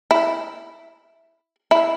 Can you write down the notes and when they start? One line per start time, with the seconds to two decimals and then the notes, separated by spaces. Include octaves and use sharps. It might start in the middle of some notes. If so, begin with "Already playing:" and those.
0.11 E4
1.71 E4